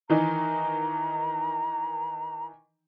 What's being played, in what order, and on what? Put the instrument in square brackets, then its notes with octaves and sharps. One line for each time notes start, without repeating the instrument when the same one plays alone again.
[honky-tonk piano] D#3 E3 D#4 [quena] A#5